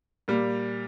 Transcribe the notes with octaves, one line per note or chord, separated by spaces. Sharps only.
A#2 G3